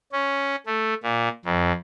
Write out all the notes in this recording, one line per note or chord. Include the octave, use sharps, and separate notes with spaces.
C#4
A3
A#2
F2